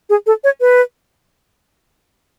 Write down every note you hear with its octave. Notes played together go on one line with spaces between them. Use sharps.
G#4
A4
C#5
B4